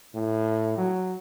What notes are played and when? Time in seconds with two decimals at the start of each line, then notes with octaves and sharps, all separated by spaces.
0.14 A2
0.77 F#3